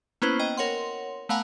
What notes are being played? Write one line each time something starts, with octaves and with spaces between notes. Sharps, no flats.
A#3 B3 C#4 E4 B4 C5
D#5 G5
A#4 C#5 F#5 C6
A3 B3 F5 F#5 G#5 A#5